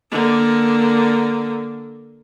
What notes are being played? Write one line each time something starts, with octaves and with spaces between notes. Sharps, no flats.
D3 A#3